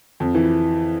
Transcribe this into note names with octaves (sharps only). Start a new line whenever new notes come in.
F2
E3